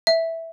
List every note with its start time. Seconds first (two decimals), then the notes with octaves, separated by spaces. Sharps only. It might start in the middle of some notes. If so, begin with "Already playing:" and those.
0.07 E5